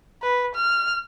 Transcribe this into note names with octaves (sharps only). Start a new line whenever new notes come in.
B4
F6